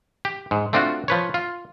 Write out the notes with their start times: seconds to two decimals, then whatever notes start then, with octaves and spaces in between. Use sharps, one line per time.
0.25 G4
0.51 G#2
0.73 A3 C4 D4 F4 F#4
1.08 F3 B4 C#5
1.34 F4